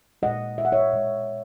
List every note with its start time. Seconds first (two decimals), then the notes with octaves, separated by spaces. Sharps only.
0.22 A#2 G#3 D#5 F#5
0.58 E5
0.65 F#5
0.72 C#5 E5
0.93 B2 G#3